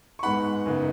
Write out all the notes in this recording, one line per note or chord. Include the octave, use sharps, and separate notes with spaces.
C#6
G#2 G#3 B3 D#4 F#5 B5
F#2 C#3 B3 D#4